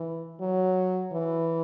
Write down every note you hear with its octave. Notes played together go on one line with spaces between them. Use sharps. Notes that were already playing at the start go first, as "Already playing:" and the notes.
Already playing: E3
F#3
E3